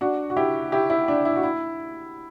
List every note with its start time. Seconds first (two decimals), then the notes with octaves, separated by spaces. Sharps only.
0.01 D4 F#4
0.30 F#4
0.37 E4 G4
0.72 E4 G4
0.90 E4
1.08 D4
1.25 E4
1.36 F#4
1.43 E4